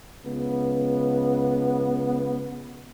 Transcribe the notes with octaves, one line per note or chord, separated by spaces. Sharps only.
C#2 B3